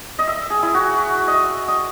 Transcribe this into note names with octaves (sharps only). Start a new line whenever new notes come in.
D#5
E5
G#4
E4
F#4
D#5 E5
D#5